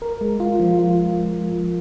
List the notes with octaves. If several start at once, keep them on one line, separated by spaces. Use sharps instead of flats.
A#4
G#3
F4
F3
F4